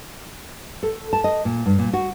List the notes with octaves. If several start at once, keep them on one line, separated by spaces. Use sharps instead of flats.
A4
A5
D#5
A#2
G2
A#2
F#4